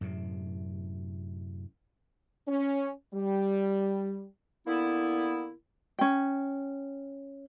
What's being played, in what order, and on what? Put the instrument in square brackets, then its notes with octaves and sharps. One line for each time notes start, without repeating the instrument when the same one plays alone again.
[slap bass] F#2 A2 C3
[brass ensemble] C#4
G3
[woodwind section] D3 A#3 B3 E4
[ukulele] C#4 G5